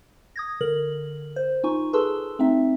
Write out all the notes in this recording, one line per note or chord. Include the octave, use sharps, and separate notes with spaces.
D#6 G#6 A#6
D3 A#4 F#7
C5
D#4 F4 G#5 C#6
G#4 A4 B4 A5 C6 E6
A3 C4 D#4 E5